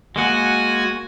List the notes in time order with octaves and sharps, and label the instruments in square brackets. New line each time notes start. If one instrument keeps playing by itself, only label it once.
[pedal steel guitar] G#3 A#3 F#5 [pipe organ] F#4 G#5